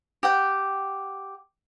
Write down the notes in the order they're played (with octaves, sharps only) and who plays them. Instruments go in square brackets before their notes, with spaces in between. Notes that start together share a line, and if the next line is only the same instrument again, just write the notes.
[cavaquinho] G4 F#5 G5